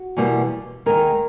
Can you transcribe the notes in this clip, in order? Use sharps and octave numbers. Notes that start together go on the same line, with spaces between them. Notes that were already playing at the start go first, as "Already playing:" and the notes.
Already playing: F#4
E2 B2 G3 A#3
D#2 D#3 G#3 A#4